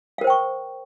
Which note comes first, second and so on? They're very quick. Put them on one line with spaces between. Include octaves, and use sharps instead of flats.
F5 A#4 C5 G5 C#6